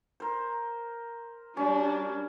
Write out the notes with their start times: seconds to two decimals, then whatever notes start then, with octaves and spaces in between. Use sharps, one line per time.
0.20 A#4 C5
1.57 G3 C#4 D4 F#4